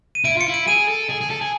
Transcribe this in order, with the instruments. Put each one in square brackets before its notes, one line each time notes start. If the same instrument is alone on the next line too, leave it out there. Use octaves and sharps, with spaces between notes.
[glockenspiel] D#7
[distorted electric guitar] E4 [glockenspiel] D7
[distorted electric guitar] F4 [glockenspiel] C#7
[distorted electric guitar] E4
[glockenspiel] D7
[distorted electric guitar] G#4 [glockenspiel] D#7
[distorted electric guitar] A4
G#4
G#4
A4
G#4